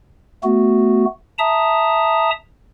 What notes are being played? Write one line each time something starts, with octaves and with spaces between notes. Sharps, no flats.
A3 B3 F#4
E5 A5 A#5 D#6